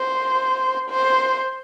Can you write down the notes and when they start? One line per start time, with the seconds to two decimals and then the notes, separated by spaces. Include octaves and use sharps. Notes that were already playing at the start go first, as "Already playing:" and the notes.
Already playing: C5
0.89 C5